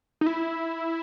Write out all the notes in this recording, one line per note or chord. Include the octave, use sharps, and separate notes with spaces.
D#4
E4